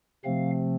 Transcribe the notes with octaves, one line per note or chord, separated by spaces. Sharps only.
C3 F3 A3 C4 F5